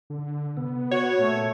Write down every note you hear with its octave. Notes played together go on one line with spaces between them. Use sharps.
D3
C3 B3
F#4 C#5
A#2 A3